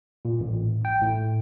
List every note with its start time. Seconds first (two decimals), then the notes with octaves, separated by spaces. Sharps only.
0.25 A#2
0.40 A1
0.85 G5
1.02 A2